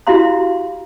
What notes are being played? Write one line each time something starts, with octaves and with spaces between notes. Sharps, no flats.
E4 F#4 G4 F5 A#5 C6